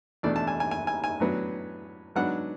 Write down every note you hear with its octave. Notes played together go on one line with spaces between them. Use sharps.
E2 B2 A3 D4 D5
A5
G#5
G#5
G#5
G#5
G#5
A2 F#3 B3 D4
G#2 F#3 B3 D4 F#5